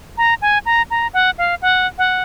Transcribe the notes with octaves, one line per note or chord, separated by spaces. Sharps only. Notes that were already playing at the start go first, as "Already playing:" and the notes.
A#5
G#5
A#5
A#5
F#5
F5
F#5
F#5